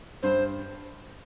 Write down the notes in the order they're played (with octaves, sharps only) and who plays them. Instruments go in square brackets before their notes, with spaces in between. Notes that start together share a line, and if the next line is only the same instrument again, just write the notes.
[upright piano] G2 [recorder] C5